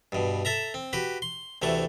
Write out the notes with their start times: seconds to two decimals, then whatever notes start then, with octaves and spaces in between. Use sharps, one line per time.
0.12 G2 B2
0.45 A4 E5 A#5
0.74 C4
0.93 F#4 G4 B4
1.22 C6
1.62 D2 C3 E3 A3 C#6